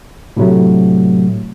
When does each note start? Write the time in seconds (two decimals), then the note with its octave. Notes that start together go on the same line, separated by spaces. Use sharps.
0.37 A2 C3 F#3 A3